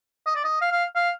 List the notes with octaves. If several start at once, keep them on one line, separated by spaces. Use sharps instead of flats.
D#5
D5
D#5
F5
F5
F5